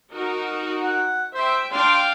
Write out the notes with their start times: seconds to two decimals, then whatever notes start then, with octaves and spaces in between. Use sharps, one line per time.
0.12 D#4 F#4 A#4
0.83 F#5
1.34 C5 E5 G5
1.71 D4 F5 G5 C6